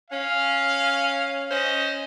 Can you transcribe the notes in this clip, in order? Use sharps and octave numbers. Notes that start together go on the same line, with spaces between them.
C#4 F5
C#4 C5 D#5